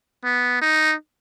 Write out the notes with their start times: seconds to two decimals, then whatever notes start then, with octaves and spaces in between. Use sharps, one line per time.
0.25 B3
0.62 D#4